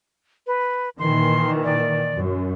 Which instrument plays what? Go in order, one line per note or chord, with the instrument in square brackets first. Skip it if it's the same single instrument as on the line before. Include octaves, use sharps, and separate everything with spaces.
[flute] B4
[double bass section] A#2 D#3 E3 [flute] C6
[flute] D5
[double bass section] F#2